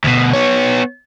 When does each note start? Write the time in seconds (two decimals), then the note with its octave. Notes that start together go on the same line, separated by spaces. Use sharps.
0.04 D2 B2
0.33 B3 C#5